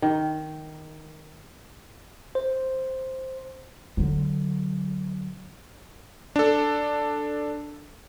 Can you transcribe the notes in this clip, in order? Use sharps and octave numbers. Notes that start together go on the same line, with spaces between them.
D#3
C5
D3 F#3
D4 A4